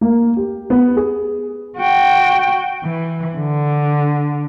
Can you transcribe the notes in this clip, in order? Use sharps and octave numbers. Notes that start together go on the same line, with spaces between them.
A#3
G4
B3
G#4
F#4 G5
E3
D3